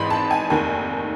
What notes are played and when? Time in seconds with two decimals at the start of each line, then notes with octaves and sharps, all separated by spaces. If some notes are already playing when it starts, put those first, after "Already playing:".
Already playing: G#1 G#2 E3 B5 C6
0.10 A5
0.31 G#5
0.50 F1 D#2 D#3 G#5